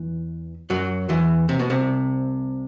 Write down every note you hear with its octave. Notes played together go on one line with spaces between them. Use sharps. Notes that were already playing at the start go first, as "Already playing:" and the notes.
Already playing: E2 E3
F#2 F#3
E2 E3
C3
B2
C2 C3